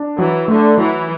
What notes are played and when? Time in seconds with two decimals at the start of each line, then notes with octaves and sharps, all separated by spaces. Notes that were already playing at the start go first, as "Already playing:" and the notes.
Already playing: D4
0.17 E3 F#3
0.48 D3 A3
0.77 E3 F#3